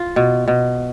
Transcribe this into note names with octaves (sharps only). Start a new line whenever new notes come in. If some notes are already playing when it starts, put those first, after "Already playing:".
Already playing: F4
B2
B2